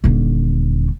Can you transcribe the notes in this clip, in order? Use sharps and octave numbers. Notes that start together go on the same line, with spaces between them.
D#1 D3